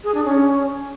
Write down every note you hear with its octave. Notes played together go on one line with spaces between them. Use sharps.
G#4
D4
C#4